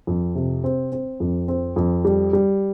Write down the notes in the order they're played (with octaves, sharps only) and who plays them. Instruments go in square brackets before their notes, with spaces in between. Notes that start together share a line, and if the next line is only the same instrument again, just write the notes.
[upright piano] F2
C3
C4
C4
F2
C4
F2
G3
G3